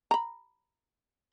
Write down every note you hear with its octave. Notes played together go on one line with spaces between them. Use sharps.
A#5 B5